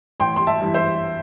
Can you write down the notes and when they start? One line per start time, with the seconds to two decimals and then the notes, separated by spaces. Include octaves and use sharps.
0.20 A1 G5 C6
0.36 C6
0.47 E5 A5
0.60 G2 E3
0.74 C5 E5